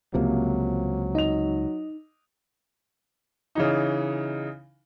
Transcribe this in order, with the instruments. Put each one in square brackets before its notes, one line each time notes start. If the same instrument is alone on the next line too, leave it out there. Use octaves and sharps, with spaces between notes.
[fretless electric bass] C#2 C3 F3 [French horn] F#3 [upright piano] A#3
[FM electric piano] D#4 [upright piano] D#5 F7
[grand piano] C#3 E3 D#4